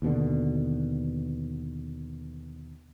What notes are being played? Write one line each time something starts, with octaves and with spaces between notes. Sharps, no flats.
D#2 B2 D3